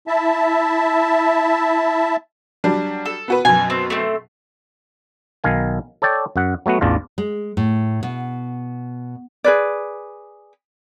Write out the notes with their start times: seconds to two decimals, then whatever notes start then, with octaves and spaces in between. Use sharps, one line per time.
0.07 E4 E5 A5
2.64 F#3 G3 D4
3.05 A4
3.28 B3 F#4 B4
3.45 F#2 B2 G#5
3.70 C4
3.90 A3 C4
5.44 B1 D#3 F5 G#5
6.02 A4 C#5 D5 G5
6.36 F#2 F#5
6.66 F#3 A3 B3 F#4
6.81 A1 E2 D4 F4
7.18 G#3
7.57 A2
8.03 B2
9.44 G#4 B4 D5